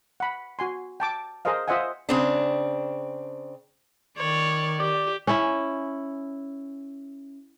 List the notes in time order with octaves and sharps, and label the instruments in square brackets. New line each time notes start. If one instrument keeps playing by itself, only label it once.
[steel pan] F#5 B5
F#4 G#5 C6
G5 A5 D6
G#4 A#4 C5 D#5 F5
F4 C5 D#5 E5 F#5 G#5
[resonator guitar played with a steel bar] C#3 C4 D4
[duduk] D#3 [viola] C#5 D5
[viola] G4 [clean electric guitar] D5
[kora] C#4 E4